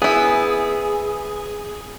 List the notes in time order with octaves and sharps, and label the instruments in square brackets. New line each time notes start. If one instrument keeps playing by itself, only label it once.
[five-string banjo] B3 E4 [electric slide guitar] G#4